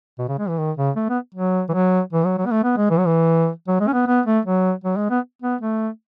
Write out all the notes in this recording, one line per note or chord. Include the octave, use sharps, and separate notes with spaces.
B2
C#3
G#3
E3
D#3
C#3
A3
B3
F#3
E3
F#3
E3
F#3
F#3
B3
A3
B3
G#3
E3
F#3
E3
F#3
G#3
C#4
B3
B3
A3
F#3
F#3
G#3
B3
B3
A3